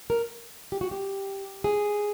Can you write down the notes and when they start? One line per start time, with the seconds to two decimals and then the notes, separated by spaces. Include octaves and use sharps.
0.10 A#4
0.72 G4
0.81 F#4
0.91 G4
1.64 G#4